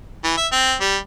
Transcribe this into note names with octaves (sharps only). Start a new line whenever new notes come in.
E3
E5
C4
G3